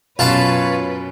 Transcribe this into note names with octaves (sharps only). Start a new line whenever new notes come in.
F#2 B2 F#3 F4 B4 C#5 A5 B5